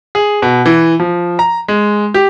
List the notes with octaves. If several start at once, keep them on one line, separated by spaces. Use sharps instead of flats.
G#4
B2
E3
F3
A#5
G#3
G4